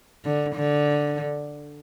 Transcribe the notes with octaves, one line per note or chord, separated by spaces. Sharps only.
D3
D3